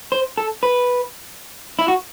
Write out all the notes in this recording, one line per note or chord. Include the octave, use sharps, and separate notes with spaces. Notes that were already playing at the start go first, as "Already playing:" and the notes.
C5
A4
B4
E4
F#4